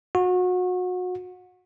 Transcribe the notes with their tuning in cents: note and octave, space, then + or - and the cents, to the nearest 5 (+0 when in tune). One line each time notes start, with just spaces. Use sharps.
F#4 -30